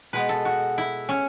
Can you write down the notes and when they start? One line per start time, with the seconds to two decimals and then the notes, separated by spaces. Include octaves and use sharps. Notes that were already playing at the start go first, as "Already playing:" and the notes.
0.13 B2 G#3 B3 B4
0.29 A4
0.45 F#4
0.78 E4
1.09 C#4